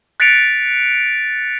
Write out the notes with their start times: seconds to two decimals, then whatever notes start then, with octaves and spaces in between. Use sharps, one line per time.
0.20 F#6 A6 B6 C#7 D7 F7